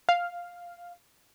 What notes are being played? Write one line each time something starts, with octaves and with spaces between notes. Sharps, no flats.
F5